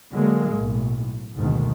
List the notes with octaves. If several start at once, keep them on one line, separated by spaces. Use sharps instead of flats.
D3 F#3 G#3 A#3
B1 A2
F#1 D2 G#2 B2 D#3